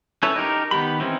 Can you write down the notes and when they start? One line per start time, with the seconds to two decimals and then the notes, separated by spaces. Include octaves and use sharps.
0.23 C#4 E4 A4 B4 C#5
0.36 D#4 G4 A#4
0.71 D#3 B3 G4 B5
1.00 E3 C4 C#4 D#4